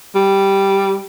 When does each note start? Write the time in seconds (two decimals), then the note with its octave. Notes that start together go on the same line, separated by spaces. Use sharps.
0.15 G3